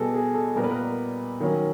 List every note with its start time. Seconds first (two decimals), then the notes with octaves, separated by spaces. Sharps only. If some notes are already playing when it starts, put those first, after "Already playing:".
Already playing: B2 G3 B3 G#4 A4
0.14 G#4
0.34 A4
0.56 A#2 G3 B3 A#4
0.64 B4
0.71 A#4
1.40 D#3 F#3 A#3 C#4